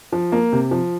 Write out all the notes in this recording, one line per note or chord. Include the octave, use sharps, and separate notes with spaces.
F3
A#3
C3
F3